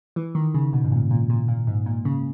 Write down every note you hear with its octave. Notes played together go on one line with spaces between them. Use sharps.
E3
D#3
C#3
B2
G#2
A#2
A#2
A#2
A#2
G#2
A#2
C#3